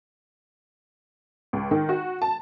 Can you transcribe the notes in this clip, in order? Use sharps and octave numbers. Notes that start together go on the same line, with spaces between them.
C#2
D#3
F#4
A5